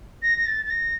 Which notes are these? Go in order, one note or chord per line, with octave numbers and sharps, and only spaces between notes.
A#6
A#6
A6
A6
A#6